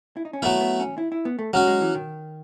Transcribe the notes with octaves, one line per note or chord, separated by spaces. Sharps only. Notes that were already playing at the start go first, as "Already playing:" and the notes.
E4
D#4
C#4
F#3 A3 B3 E4
B3
C#4
E4
E4
B3
A3
F#3 G#3 C#4 F#4
G#3
E3
D#3